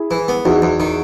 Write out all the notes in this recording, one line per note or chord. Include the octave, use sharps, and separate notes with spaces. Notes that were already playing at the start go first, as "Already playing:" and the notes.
Already playing: E4 G#4
E3
B3
E2 D#4 F#4
E2
D#3